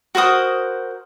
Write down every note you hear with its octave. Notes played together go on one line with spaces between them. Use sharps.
F#4 A#4 C5 D#6